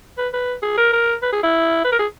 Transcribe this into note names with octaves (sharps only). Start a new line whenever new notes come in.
B4
B4
G#4
A#4
A#4
B4
G#4
E4
B4
A#4
G#4